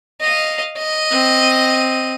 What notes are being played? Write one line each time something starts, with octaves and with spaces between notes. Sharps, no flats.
D#5 F5
D#5
C4